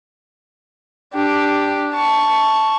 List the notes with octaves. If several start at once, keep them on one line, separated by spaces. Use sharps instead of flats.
D4 G4
A5 C#6